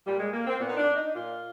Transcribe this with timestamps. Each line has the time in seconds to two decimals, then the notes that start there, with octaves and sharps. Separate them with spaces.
0.04 A#2 G3
0.18 G#3
0.32 A#3
0.45 C4
0.58 A#2 B3
0.67 D#4
0.76 D4
0.94 D#4
1.12 A#2 F4